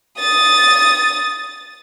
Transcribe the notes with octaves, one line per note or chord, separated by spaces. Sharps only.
D#6 A6